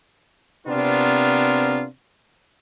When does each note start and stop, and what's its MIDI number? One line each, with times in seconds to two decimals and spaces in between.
0.67 1.85 48
0.67 1.85 59
0.67 1.85 60
0.67 1.85 62
0.67 1.85 65
0.67 1.85 70